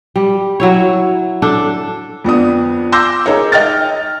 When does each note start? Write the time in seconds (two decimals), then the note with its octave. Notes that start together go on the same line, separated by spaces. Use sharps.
0.16 G3
0.60 F#3 E4 C#5
1.42 D4 A4
2.25 F2 B3 D4 D#6
2.92 C6 D6 E6 G6 A#6
3.26 D#4 G#4 A#4 C#5
3.52 D#5 G5 F6 A6